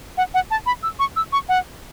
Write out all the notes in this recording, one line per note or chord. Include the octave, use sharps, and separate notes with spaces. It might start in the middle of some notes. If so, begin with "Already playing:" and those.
F#5
F#5
A5
B5
E6
C#6
E6
C#6
F#5